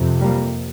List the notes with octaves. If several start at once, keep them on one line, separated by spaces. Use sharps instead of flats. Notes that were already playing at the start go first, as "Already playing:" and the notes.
Already playing: F2 C3
G3 A#3